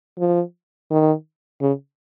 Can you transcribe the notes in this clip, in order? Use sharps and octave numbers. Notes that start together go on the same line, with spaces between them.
F3
D#3
C#3